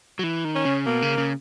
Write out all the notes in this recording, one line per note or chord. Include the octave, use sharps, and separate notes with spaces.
F#3
E3
D#3
C#4
C#3
B2 A#3
C#3
C#3